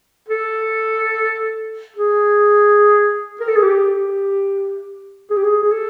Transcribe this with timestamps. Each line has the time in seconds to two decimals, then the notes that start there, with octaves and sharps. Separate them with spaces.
0.29 A4
1.96 G#4
3.41 A#4
3.48 A4
3.56 G#4
3.62 G4
5.30 G#4
5.36 G4
5.44 G#4
5.63 G#4
5.72 A4